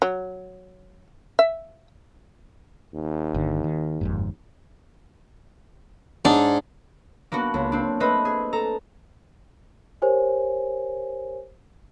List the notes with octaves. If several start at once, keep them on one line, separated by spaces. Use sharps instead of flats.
F#3
E5
D#2
G1 D3
D#3
G1 F2 G#2
G#2 D4
A#3 B3 D4 F#4
C#2
C4 D4
A3 C4 B4 D#5 B5
G#4
A4 A#5
G4 A#4 C5 C#5 G#5